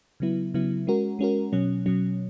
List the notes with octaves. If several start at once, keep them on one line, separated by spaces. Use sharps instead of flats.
C#3 F#3 B3 E4
C#3 F#3 B3 E4
G#3 C#4 F#4 A#4
G#3 C#4 F#4 A#4
B2 F#3 C#4
B2 F#3 C#4